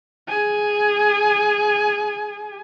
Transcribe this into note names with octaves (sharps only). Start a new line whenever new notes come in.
G#4 G#5